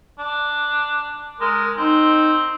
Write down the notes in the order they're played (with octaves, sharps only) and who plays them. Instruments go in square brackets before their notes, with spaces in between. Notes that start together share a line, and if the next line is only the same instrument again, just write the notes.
[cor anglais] D4
[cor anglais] G#3 [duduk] A#4
[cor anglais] C4 [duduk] D#4